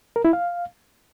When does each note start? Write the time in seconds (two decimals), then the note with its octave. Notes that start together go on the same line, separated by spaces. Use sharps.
0.16 A#4
0.25 E4
0.33 F5